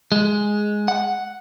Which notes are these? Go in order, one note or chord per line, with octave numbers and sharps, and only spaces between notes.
G#3
F#5